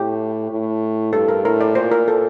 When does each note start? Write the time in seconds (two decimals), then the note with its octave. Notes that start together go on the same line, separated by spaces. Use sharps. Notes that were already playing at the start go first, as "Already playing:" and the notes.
Already playing: A2 G4
0.51 A2
1.13 G2 A4
1.28 A#4
1.45 A2 A#4
1.61 D5
1.75 A#2 C5
1.91 A#4
2.08 A4